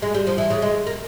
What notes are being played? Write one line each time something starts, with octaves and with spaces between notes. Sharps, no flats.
G#3
G3
F3
E3
C#3
G#3
A#3